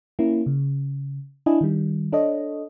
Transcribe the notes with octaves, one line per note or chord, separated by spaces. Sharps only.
A#3 C#4 E4
C#3
D4 E4 D#5 G#5
D#3 G3
D4 A4 C#5 D#5